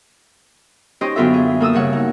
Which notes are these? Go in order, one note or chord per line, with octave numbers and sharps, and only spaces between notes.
C#4 D#4 G4 C5 D#5
F#2 D3 B3 F4 A4 E5
G#4
A#3 A4 D#6 E6
G2 C#3 C#5 F#5
D#4